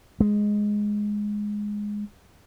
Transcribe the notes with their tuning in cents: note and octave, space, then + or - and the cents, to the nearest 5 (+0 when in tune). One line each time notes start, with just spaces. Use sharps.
G#3 +0